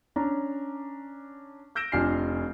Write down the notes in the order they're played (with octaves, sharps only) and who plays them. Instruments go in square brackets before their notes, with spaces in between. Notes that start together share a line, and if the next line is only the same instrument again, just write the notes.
[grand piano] C#4 D4 A#5
E6 G6 A#6 D7 E7
F1 D4 F4 G#5 F6 C7